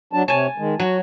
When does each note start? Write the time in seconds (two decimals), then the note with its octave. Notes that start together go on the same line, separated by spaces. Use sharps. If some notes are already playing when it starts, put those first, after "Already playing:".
0.13 F#3 D4 A5
0.28 C3 C#5 G#5 A5
0.58 D#3 G#3
0.80 F#3 F#4